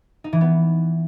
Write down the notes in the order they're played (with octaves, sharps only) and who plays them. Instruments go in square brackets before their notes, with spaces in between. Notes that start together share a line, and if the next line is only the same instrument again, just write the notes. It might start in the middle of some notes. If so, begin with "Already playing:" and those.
[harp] D#4
E3
B3